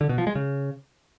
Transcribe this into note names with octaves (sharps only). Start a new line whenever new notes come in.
D3
B2
F3
G#3
C#3